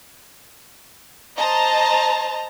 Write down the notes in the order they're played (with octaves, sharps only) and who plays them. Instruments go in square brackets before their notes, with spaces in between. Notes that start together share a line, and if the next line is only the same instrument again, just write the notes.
[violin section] C5 D#5 A5 A#5